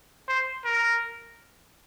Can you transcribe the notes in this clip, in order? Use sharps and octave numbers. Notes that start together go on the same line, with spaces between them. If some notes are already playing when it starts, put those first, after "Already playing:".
C5
A#4